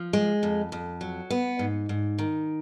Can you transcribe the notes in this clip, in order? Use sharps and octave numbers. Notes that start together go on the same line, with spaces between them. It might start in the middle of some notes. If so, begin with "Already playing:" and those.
Already playing: F3
G#3
F2
F2
F#3
B3
G#2
G#2
D#3